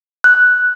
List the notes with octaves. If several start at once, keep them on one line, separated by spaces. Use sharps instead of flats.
F#6